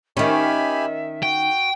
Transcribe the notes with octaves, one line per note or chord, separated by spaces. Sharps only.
D#3 C#4 G4 E5 G#5 B5
F#4 G5